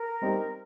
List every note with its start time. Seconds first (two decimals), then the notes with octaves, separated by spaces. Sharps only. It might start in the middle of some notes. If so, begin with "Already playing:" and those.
Already playing: A#4
0.21 G3 C4 D#4 G4